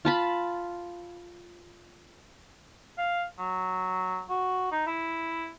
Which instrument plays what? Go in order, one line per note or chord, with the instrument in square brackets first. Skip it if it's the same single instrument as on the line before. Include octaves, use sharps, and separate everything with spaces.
[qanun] F4 A5 B5
[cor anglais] F5
F#3
F#4
D#4
E4